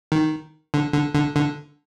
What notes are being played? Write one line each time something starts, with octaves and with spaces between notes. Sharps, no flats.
D#3
D3
D3
D3
D3